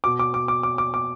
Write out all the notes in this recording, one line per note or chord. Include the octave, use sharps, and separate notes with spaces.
B2 D6
D6
D6
D6
D6
D6
D6